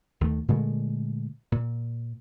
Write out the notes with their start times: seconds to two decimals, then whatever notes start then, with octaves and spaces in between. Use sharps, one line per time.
0.21 D#2 D#3 A3
0.48 A#2 D3 G#3 A3
1.52 A#2